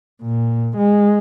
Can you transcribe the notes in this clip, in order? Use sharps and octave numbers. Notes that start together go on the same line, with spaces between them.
A#2
G#3